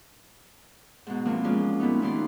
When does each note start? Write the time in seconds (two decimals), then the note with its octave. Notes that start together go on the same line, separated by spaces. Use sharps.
1.07 G#2 B2
1.25 E2 F3 A#3 C4
1.44 G#3 C#4 F4 D5
1.80 A#2 A3 B3 D#4
2.02 D#2 B3 D#4 D5 C6